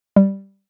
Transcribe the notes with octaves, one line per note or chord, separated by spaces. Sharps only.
G3